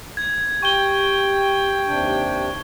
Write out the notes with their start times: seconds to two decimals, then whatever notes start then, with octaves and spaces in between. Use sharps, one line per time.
0.17 G#6
0.62 G4 G5 C#6 G7
1.87 D#2 C3 D4